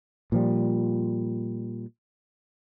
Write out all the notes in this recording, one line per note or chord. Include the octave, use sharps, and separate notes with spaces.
A#2 F3 G3